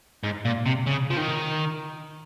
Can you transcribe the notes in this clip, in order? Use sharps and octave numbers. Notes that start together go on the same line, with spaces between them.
G#2
A#2
C3
C#3
F3
D#3